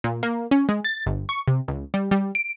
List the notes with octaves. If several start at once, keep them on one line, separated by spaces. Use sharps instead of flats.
A#2
A#3
C#4
G#3
A6
G1
C#6
C3
C#2
G3
G3
D7